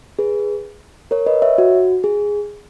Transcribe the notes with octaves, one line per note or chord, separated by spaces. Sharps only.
G#4 B4
A#4 C#5
B4 D#5
C#5 E5
F#4
G#4